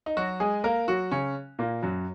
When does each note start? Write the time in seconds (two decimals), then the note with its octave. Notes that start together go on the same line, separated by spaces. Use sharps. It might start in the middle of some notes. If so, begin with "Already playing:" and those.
0.06 D#4
0.17 F#3 F#4
0.40 G#3 G#4
0.64 A#3 A#4
0.88 F#3 F#4
1.11 C#3 C#4
1.59 A#2 A#3
1.83 F#2 F#3